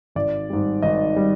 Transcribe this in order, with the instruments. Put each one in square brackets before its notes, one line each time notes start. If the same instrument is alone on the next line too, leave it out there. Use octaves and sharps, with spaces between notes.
[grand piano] G#1 D5
G#2 G3
G#1 D#5
G3